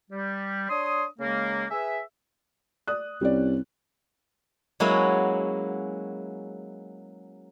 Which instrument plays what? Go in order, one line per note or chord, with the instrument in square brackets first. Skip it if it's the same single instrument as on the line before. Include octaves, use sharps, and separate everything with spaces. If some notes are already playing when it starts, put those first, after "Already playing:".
[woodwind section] G3
D4 C#5 C6 D#6
C#3 G#3 A#3
G#4 B4 E5
[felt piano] D5 D#6 F#6
[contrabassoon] C2 [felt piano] G3 C#4 D5
[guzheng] F#3 G#3 A#3 C#4 E4 F#4